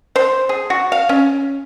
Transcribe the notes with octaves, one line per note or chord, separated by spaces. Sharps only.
C5
G#4
F#4
F5
C#4